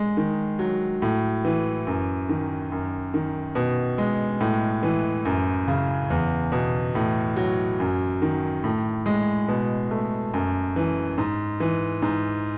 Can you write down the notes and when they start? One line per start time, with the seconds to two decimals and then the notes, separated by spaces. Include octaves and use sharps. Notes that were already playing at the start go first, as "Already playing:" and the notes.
Already playing: G#3
0.17 D#3
0.59 F#3
1.02 A2
1.45 E3
1.87 F#2
2.29 D#3
2.72 F#2
3.14 D#3
3.55 B2
3.98 G#3
4.41 A2
4.83 E3
5.25 F#2
5.68 C#3
6.10 E2
6.52 B2
6.95 A2
7.36 F#3
7.80 F#2
8.22 D#3
8.64 A2
9.06 G#3
9.48 B2
9.91 A3
10.34 F#2
10.76 E3
11.18 G#2
11.60 E3
12.02 G#2